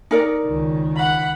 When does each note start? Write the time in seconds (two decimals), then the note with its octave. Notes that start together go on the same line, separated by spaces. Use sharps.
0.11 D#4 A#4 D5
0.44 C#2 D#3
0.95 F#5 B5